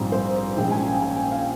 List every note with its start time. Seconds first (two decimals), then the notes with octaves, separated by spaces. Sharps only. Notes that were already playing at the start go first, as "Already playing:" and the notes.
Already playing: A#1 G#2 G3 C4
0.12 C5
0.57 A#1 A#2 G#3 C#4 G5
0.72 G#5
0.87 G5
1.02 G#5
1.17 G5
1.32 F5